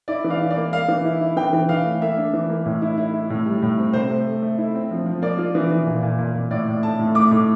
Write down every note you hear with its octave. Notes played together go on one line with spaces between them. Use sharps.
E4 D5
E3
F5
E4
D5
A#3
A#3 F5
E3
E4
E4
E3 G5
E3
E3 F5
A3
A#3 E5
D4
E3
A#3
A2
E4
E4
E4
A2
G3
A2
C4
C3 C5
A3
A3
A3
E4
C4
F3
F3
A#3 D5
F4
E3
E3
A#2
A#2
A#2
A#2
A2 D5
A2
A3 A5
A2
A3 D6
A2